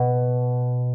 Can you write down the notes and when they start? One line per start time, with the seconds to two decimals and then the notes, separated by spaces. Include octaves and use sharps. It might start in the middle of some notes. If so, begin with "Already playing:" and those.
Already playing: B2